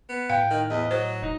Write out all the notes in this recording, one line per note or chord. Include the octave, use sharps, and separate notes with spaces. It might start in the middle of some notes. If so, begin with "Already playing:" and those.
B3
A2 F5 G5
D#3
E2 D#5
F#3 C5
E1 D#4